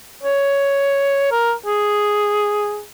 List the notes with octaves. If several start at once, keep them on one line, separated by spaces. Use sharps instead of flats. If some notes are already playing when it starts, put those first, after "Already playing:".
C#5
A#4
G#4